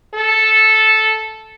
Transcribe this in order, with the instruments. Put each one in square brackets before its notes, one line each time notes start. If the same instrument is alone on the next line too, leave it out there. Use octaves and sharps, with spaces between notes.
[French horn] A4